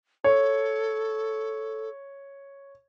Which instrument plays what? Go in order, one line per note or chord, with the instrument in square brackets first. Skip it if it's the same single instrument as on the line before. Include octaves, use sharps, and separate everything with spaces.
[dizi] A4 [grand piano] C#5